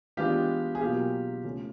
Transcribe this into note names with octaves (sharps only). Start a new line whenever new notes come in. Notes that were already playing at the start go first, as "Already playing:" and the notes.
E3 G#3 B3 D4 F4 G4
G#4
B2 F#3 A#3 F4 G4
C#3 F3 A3 C#4